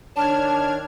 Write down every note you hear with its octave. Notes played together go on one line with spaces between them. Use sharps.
D#3 D4 D#4 C#5 A5 F6 G#6